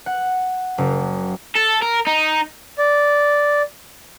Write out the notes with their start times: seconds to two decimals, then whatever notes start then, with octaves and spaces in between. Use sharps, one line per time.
0.06 F#5
0.78 F#1
1.55 A4
1.82 A#4
2.07 D#4
2.78 D5